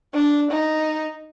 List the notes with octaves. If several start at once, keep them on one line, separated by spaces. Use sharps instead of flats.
D4
D#4